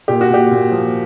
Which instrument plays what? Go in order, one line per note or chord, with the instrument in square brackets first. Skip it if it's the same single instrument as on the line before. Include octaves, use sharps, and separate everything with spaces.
[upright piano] A#2 G4
F#4
A#2 G4
A#2
F3